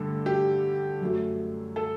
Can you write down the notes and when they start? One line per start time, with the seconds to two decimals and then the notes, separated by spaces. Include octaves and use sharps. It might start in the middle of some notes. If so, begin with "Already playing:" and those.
Already playing: G2 D3 A3 A4
0.26 G4
1.01 F#2 F#3 A3
1.76 A4